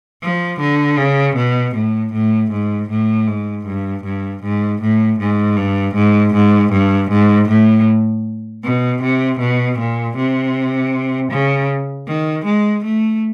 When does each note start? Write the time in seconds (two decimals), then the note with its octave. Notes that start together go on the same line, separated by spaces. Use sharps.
0.23 F3
0.61 D3
0.98 C#3
1.36 B2
1.76 A2
2.13 A2
2.51 G#2
2.90 A2
3.27 G#2
3.66 G2
4.04 G2
4.43 G#2
4.82 A2
5.19 G#2
5.57 G2
5.95 G#2
6.34 G#2
6.72 G2
7.10 G#2
7.49 A2
8.64 B2
9.02 C3
9.40 B2
9.78 A#2
10.17 C3
11.31 C#3
12.07 D#3
12.45 G#3
12.84 A3